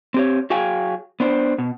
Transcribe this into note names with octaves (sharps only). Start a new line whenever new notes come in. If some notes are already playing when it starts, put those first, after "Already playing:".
C4 G4 C#5
F#3 F#4 G#4 F5 G5 G#5
B3 D4 C5
B2